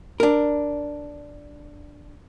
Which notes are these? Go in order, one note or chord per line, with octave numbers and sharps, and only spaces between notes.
D4 A#4